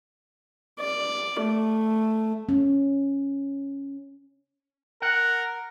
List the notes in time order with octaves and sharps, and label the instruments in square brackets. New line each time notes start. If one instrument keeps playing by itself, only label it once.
[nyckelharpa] D5
A3
[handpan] C#4
[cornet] A#4 [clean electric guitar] F#5